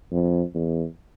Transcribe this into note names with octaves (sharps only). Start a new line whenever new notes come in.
F2
E2